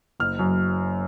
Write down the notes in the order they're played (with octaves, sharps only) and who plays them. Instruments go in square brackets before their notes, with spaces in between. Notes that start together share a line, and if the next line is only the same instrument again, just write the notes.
[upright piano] F#1 F6
F#2